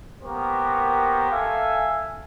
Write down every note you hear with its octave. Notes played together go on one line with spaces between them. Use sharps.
A#3 B3 F#4 G4 A#4 C5
A4 E5 F5 G#5